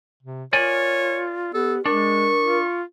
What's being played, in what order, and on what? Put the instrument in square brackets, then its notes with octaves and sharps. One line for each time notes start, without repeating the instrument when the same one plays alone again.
[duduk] C3
[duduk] F4 [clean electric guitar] A#4 D5 G#5 [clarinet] C#5
[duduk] B3 [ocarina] G4 [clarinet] A4
[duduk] G#3 [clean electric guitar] D4 [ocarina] A#4 [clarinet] C#6
[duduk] F4